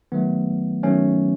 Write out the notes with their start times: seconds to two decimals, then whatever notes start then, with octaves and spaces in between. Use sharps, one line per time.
0.12 D#3 F#3 A3 B3
0.83 D#3 F#3 A3 C#4